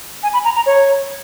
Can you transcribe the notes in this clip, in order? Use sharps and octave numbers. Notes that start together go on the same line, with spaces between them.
G#5
B5
A#5
A#5
C#5